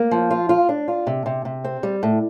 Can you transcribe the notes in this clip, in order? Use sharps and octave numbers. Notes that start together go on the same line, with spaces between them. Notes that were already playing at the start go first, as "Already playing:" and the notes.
Already playing: A#3
F3
F4
F4
D4
F4
C3
C3
C3
C4
G3
A2